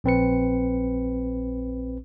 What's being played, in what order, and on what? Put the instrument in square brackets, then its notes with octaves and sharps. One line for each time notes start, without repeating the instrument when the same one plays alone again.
[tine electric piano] A#1 C4 B4 C#7